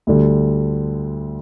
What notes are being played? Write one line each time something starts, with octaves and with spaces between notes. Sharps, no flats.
D2 D3 G3